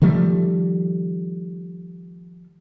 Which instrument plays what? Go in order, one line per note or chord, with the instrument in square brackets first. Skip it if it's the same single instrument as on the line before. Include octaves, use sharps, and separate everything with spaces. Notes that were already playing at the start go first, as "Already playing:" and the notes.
[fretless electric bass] D#3 F3 G3 A3